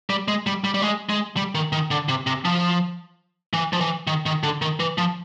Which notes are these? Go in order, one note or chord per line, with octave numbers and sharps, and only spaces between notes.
G3
G#3
G3
G3
G3
G#3
G#3
G3
D#3
D#3
D3
C3
C3
F3
E3
F3
E3
D#3
D#3
D3
D#3
E3
F3